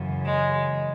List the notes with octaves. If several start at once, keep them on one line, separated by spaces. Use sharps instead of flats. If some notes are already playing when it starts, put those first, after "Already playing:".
Already playing: F#2 C#3 E3
G#3